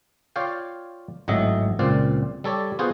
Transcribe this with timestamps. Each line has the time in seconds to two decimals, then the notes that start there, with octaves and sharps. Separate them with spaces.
0.36 F4 C#5 D5 F5 G5
1.28 G#1 A2 F#3 D#5 E5
1.79 C#2 A#2 C4 D5 F5
2.44 G3 A4 C#5 D5
2.79 B3 F4 F#4 G#4 C5